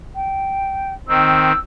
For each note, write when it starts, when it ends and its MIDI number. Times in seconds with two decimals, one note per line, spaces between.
0.16 0.94 79
1.08 1.52 51
1.08 1.52 60
1.08 1.59 88